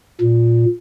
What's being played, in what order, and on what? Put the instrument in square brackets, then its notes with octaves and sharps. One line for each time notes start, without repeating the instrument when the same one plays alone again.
[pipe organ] A#2